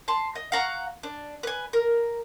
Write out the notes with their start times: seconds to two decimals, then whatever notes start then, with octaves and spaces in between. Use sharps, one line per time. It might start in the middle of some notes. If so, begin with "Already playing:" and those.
0.08 A5 C6
0.35 D#5
0.52 F5 F#5 A#5 C#6
1.03 D4
1.43 B4 G#5
1.73 A#4